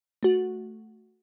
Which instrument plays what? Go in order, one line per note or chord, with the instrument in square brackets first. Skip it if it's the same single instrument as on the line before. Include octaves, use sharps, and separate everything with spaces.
[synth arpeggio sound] A3 F#4